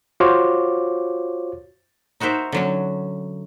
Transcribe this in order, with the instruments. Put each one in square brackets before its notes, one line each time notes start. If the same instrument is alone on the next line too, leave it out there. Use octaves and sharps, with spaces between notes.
[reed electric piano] F4 F#4 C5 C#5 F5 D6
[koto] D#4 F#4 A#4 C5 E5
D3 F#3 C#4